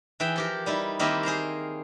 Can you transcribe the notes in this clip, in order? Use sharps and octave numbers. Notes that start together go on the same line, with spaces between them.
E3 G#4 E5 G5
F3 G4 A#4
G3 D#4 E4
D#3 A#3 C4 E4 G4 D#5
G#4 C5 F5 A#5